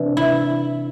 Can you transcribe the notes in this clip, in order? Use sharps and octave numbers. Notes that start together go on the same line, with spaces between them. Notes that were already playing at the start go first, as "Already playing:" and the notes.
Already playing: C3 E3 D4
E4